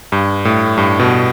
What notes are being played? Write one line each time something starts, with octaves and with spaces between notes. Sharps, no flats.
G2
A2
G2
B2